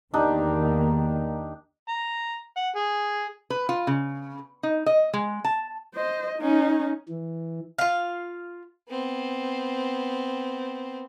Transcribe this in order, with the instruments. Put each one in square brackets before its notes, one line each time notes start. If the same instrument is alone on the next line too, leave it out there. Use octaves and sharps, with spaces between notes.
[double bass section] E2 D#3 A#3 [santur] D4 D#4 G4
[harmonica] A#5
F#5
G#4
[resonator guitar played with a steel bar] B4
F4
C#3
D#4
D#5
G#3
A5
[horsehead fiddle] C5 D#5
C#4 D#4
[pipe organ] E3
[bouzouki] F4 F5
[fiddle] B3 C4